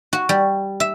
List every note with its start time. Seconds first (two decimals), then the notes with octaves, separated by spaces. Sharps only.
0.13 F#4
0.29 G3
0.80 E5